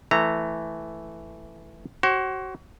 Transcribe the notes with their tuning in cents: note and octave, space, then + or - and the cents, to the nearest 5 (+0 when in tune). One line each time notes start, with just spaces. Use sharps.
E3 +0 A3 +0 A#5 -15
F#4 +30 C5 +45